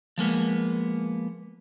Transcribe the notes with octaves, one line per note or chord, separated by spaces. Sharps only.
F3 G#3 A#3 B3